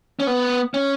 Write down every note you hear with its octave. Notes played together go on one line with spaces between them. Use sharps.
C#4
B3
C#4